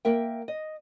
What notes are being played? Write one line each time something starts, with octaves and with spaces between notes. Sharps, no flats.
A#3 A#4 E5 G5
D#5